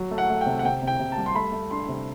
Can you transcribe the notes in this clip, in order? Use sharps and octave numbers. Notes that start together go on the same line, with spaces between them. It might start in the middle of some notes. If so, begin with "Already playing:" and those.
Already playing: F#3
A3
F#5
A3
G5
C3
F#5
C3 G5
C3
G5
C3
A5
G3
C6
A3 B5
A3
D4 C6
C3